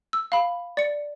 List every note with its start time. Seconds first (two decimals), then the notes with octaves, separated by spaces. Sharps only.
0.13 E6
0.32 F5 B5
0.77 D5 C#7